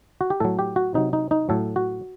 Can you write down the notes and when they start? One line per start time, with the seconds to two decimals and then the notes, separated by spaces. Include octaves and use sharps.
0.21 F#4
0.30 G4
0.40 A2 F#3 A4
0.59 G4
0.76 F#4
0.94 C3 F#3 D#4
1.13 D#4
1.31 D#4
1.49 A2 F#3 A4
1.76 F#4